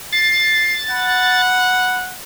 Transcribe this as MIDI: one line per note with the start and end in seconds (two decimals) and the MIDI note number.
0.13 1.42 93
0.13 0.75 96
0.91 2.16 78
0.91 1.97 83